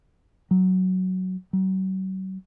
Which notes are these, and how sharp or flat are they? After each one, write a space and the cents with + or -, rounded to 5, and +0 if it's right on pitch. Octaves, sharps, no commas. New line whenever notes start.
F#3 +5
F#3 +40